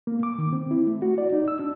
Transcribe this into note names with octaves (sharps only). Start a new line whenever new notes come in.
A#3
D6
D#3
C4
E4
A3
F#4
D5
D#4
E6
D4